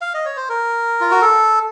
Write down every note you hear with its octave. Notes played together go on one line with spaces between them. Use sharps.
F5
D#5
C#5
C5
A#4
F4
F#4
A4